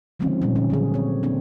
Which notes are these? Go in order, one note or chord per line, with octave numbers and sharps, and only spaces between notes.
D3 D#3 F3 G#3 C4 C#4
A#2 G3 C#4
D3 C#4
D3 F#3 G#4
C4 C#5
A#3 C4 D4